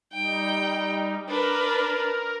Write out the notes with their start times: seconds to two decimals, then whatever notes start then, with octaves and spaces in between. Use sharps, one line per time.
0.13 G3 D#4 G5
1.28 D4 A#4 B4